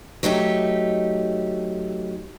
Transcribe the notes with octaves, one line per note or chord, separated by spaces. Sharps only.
F#3 A3 D#4 G4